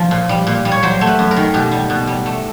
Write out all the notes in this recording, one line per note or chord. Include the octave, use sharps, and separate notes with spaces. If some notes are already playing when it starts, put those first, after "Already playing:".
Already playing: F3
A#2
G3
A#2
G3
C#5
F#3 C5
A3
B4
F#2
A#4
D#3
B2 G4
G3
B2
G3
A3